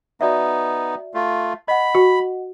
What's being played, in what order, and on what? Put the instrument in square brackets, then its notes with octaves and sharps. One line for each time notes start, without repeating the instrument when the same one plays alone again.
[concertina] B3 D#4 [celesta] F#4 D5 E5
[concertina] A3 F4
[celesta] D#5 F#5 [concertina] B5
[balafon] F#4